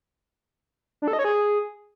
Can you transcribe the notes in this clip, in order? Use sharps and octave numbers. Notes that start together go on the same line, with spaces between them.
D4
A4
D#5
C#5
G#4